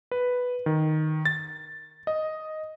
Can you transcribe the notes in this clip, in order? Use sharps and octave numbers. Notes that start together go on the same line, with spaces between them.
B4
D#3
A6
D#5